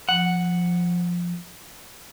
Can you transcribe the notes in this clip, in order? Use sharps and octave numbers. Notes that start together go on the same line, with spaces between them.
F3 F#5